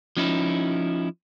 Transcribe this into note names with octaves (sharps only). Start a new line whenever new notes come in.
F3 C#4 D#4 E4